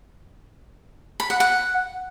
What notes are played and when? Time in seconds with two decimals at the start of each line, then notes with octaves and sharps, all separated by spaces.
1.20 B5
1.30 F#5
1.40 F#5